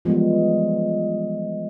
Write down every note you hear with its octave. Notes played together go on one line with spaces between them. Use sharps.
E3 F3 G3 G#3 B3